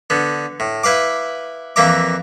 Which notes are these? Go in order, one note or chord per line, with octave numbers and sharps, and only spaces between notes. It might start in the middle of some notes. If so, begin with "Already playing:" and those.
D3 B3
A2
E4 B4 F5 D6
F2 E3 A#3 E5 A#5 D6